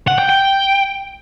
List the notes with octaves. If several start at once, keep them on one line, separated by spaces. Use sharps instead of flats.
F#5
G5
G5